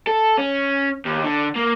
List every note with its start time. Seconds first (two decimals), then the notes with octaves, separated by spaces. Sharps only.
0.07 A4
0.38 C#4
1.05 D#2
1.23 D3
1.56 A#3